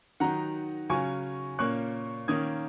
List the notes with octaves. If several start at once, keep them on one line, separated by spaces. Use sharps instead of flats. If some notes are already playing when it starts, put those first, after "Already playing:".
D#3 F#3 D#4 F#5 A#5
C#3 F#3 C#4 G#5 C#6
A#2 A#3 C#4 C#6 F#6
D#3 A#3 C#4 D#6 G#6